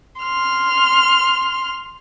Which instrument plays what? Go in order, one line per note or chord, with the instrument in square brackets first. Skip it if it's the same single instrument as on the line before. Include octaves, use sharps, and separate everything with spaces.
[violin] C6 F6